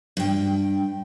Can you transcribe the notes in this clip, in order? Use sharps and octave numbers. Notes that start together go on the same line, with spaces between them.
G2 G5